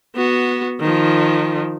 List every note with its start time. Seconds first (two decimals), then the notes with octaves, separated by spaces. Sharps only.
0.15 B3 F#4
0.80 D#3 F3